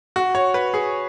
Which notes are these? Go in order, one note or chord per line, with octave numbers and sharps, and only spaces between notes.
F#4
C#5
B4
G#4